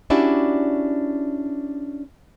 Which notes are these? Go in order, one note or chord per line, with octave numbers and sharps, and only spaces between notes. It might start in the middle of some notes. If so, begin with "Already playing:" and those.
C#4 D4 E4 F#4 G4 D5